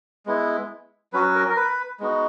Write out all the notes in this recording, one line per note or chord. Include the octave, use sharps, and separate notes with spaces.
G#3 B3 E4
F#3 C#4 F#4 B4
A#4
A#4
B4
G#3 B3 D#4 F#4